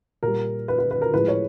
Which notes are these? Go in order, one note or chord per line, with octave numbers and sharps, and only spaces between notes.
A#2 G3 A#4
B4
B4
B4
A#4
A2 F3 G#3 B4
C#5